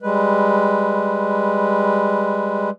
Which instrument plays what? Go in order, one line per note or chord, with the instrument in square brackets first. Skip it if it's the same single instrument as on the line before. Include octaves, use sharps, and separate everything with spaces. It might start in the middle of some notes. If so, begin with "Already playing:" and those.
[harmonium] G3 G#3 B4